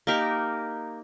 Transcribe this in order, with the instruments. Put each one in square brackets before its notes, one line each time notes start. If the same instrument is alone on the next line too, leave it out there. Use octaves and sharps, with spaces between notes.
[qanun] A#3 D#4 G4 A#4